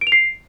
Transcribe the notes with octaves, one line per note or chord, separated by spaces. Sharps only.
D7
F7
C7